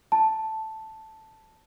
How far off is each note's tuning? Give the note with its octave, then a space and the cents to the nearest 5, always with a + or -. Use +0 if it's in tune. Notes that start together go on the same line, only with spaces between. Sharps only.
A5 +0